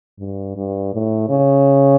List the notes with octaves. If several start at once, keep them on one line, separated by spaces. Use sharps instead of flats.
G2
G2
A2
C#3